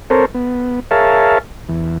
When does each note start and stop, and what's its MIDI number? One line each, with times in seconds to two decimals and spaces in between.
0.10 0.25 60
0.10 0.25 69
0.10 0.25 70
0.10 0.25 72
0.10 0.25 73
0.34 0.80 59
0.91 1.38 68
0.91 1.38 70
0.91 1.38 73
0.91 1.38 76
0.91 1.38 77
0.91 1.38 81
1.69 1.98 40